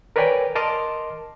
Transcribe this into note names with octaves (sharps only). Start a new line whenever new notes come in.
A#4 B4 C#5 D5 G5 G#5
A#4 D#5 A5 C6 D6 F6